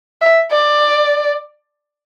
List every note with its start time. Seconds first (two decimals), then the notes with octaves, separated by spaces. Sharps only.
0.22 E5
0.52 D5